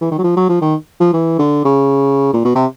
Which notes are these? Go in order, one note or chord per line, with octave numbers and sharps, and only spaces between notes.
E3
D#3
F#3
F3
F#3
F3
D#3
F3
E3
D3
C#3
A#2
B2
C3